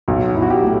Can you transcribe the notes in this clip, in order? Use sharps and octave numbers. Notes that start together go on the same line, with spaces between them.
B1 F#4
B1 E4
F#4
G4
A2